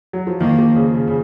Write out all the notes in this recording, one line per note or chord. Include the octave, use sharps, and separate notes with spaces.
F#3
F3
D#3 A#3
F3
C#3
C#3
C#3